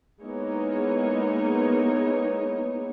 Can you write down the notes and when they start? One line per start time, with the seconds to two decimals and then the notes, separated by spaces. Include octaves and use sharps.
0.22 G#3 A#3 B3 D#4 E4 C#5